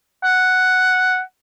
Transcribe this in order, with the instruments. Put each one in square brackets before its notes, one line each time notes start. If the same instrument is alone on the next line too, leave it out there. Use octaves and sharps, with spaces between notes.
[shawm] F#5